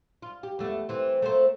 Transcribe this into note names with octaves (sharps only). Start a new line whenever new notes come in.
F4
G4
E2 A3
E3 C4
A3 A#3 C4